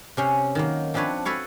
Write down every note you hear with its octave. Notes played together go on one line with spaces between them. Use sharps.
C3 C#4 C5
D#3 F#3 A#3
F3 C4 D4 B4 C#5
F#4 A4 B4 C#5 F5